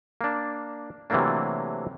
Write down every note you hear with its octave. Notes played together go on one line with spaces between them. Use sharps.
A#3 D4
C3 E3 F#3 A3 A#3 D4